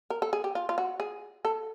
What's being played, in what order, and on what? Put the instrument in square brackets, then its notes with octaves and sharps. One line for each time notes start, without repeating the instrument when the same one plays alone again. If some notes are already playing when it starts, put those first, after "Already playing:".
[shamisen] A#4
A4
G#4
G4
F4
F4
F#4
G#4
A4